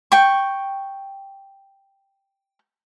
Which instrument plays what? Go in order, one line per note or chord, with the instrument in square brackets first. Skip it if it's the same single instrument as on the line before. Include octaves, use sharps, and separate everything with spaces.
[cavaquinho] G5 C#6